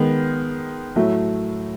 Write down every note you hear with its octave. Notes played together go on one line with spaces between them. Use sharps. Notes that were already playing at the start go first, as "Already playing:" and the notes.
Already playing: D#3 G#3 B3
A2 F#3 A3